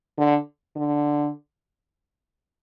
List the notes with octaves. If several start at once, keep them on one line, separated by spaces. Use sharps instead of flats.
D3
D3